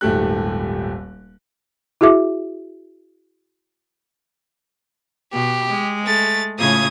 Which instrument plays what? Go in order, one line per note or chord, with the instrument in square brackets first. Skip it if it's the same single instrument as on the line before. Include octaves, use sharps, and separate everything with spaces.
[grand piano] D#1 G#1 A3 G4 F#6
[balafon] E4 F#4 G#4 E5 D6
[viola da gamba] B2 [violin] G4
[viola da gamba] G#3
[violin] A3 A6
[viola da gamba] A2 C#3 F4 [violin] D#6 G#6